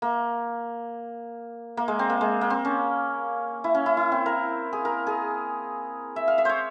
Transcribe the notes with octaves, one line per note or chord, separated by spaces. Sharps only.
A#3
A#3
G#3
C4
A#3
G#3
A#3
C4
C#4
E4
C#4
E4
E4
C4
A#4
G#4
A#4
G#4
E5
F5
E5
C5 C#5